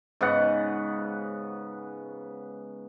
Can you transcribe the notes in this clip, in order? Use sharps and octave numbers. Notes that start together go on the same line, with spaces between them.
G#2 C#3 B3 F#5